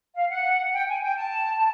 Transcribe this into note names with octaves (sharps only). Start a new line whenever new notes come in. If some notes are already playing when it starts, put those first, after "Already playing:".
F5
F#5
G5
G#5
G5
A5